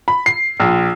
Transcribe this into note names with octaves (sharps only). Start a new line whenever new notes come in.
B5
C7
A#1